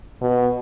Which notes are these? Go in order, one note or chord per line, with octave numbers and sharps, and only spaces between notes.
B2